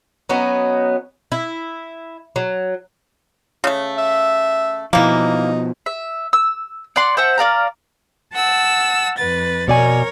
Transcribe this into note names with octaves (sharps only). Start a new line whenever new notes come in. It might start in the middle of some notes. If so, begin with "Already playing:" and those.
F#3 B3 C#4 D#4
E4
F#3
C#3 A3
E5
B2 E3 F3 A#3 D#4
E5
E6
D5 F#5 C6
C5 E5 F#5 A5
A#4 D5 F5 A#5
F#5 A5 E6
F2 B4 A6
B2 A#4 C#5 D5 G#5